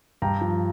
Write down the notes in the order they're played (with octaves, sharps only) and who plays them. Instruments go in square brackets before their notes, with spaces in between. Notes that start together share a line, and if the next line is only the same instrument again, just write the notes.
[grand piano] G2 G5 A#5
F3